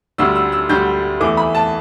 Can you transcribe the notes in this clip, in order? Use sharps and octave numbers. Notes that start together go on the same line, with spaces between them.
D2 D3 G3 E6
E6
E6
D2 D3 G3 G6
E2 E3 A3 D6
B5
A5